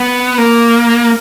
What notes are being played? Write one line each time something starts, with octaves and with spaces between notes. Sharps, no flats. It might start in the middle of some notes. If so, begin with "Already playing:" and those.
Already playing: B3
A#3